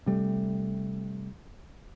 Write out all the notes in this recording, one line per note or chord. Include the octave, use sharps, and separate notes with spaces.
C3 G3 A3